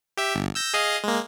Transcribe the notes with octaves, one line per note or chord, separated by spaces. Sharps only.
G4 E5
G1
E6 G6 A#6
G#4 D#5 F5
G#3 A#3